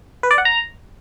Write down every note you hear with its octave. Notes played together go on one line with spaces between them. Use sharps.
B4
D5
F#5
A#5